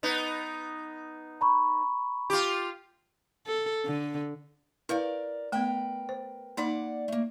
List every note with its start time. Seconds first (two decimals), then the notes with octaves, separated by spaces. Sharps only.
0.03 B3 D#4
1.41 A#5 B5 C#6
2.30 F4 G4 D6
3.46 A4
3.85 D3
4.89 E4 A#4 B4 D5 F5
5.52 A3 B3 A#4 B4 G5
6.09 C5
6.57 A#3 D#4 D5 F#5 C6
7.08 A3 A#3